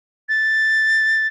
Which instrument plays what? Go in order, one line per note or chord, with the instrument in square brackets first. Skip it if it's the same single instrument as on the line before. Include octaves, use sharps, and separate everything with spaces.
[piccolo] A6